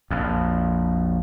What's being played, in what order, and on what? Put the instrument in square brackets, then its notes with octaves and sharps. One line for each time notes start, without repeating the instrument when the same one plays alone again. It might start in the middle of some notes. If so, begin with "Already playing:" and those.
[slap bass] A#1 F2